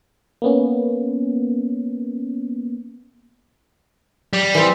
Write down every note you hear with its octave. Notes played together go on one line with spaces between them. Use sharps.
A#3 B3 C#4
G3
E3 C4